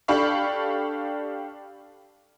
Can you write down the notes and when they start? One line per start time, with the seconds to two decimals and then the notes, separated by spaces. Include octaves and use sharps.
0.08 D4 G4 A4 F5 B5 C#6